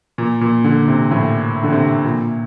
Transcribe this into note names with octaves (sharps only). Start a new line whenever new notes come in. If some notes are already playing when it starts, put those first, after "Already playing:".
A#2
A#2
D3
C3
A2
D3
C3
A#2